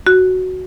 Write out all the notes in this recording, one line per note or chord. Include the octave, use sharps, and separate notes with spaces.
F#4